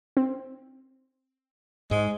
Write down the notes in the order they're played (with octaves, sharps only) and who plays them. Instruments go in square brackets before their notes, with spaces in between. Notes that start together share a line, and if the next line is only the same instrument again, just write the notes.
[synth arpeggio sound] C4
[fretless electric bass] G#2 [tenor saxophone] G#3